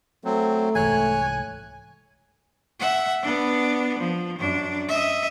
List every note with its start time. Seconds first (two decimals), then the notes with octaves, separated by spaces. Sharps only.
0.25 F#3 A3 C4
0.75 C2 G#2 E3 C#5 G#5 F#6
2.80 E5 F#5
3.22 B3 D4
3.99 F3
4.40 F#2 D4
4.88 D#5 E5